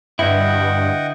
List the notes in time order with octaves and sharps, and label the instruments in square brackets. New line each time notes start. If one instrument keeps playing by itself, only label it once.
[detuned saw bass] G2 [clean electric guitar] D3 E4 [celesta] B4 E5 [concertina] D#5 F#5 G5